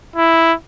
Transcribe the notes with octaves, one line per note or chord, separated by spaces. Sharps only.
E4